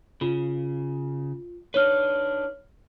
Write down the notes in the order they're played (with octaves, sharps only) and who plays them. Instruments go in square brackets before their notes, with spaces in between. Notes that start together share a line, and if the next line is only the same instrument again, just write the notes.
[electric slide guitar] C#3 [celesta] F4
[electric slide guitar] D4 D#4 B4 [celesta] C#5 F6